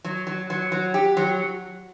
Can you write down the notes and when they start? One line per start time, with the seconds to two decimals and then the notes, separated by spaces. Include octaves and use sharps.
0.04 F#3
0.27 F#3
0.50 F#3
0.72 F#3
0.94 G4
1.17 F#3